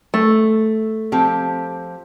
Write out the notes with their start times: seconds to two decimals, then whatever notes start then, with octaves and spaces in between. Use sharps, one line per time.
0.14 A3
1.12 F3 C4 G4